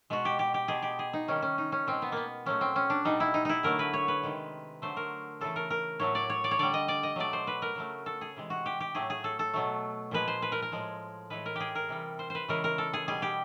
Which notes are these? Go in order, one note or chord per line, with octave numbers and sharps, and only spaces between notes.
B2 G#3 F#4
G4
G4
G4
B2 G#3 G#4
G4
G#4
D#4
C3 D#3 G3 C#4
C#4
D#4
C#4
B2 G#3 C4
B3
A#3 B3
A#2 F#3 A3 C#4
C4
C#4
D4
B2 G3 D#4
E4
D#4
D#4 E4
D3 F#3 A3 A#4
B4
C#5
B4
C3 D#3 G#3
D3 F#3 A3 C5
A#4
C#3 E3 A3 A4
A#4
A#4
A2 F#3 A3 C#5
D5
C#5
D5
C#5
D3 G3 D5
D#5
D5
D#5
B2 F#3 A3 D5
C5
B4
A#4
C#3 F#3 A3
A4
G#4
C3 E3 G#3
F#4
G4
G4
A2 F#3 A3 G#4
G#4
A4
A4
B2 F#3 A3
A#2 F3 G#3 B4
C5
B4
A#4
A#4
A2 F3 G#3
A2 E3 G#3 B4
A#4
G4 G#4
A#4
C3 E3 G3
C5
B4 C5
C#3 E3 G#3 A#4
A#4
A4
G#4
B2 G3 G#4
G4